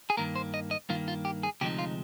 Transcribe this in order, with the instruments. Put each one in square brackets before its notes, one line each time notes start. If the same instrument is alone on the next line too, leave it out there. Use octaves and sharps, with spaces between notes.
[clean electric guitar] G#4
G2 D#3 A#3 A#4
C5
D#5
D#5
G2 D#3 A#3 F4
F4
G4
G#4
D2 C3 F3 G#3 D#4 G4
F4